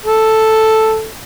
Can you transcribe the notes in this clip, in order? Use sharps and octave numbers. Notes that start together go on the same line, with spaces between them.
A4